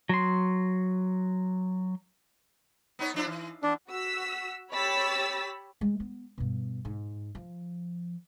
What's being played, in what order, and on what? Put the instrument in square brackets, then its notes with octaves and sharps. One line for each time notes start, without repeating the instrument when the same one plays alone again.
[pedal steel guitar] F#3 C6
[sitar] B3 D#4 C#5
F3 D4 E4
E3
[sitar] E2 [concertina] D4
[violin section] F#4 E6 B6
G4 C#5 B5 E6 A6 B6
[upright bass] G#3
B3
G2 B2
G#2
F3